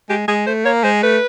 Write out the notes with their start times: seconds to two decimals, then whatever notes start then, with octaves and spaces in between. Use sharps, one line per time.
0.09 G#3 G4
0.28 G#3 G#4
0.47 A3 C5
0.65 A#3 C#5
0.84 G#3 C5
1.03 A3 B4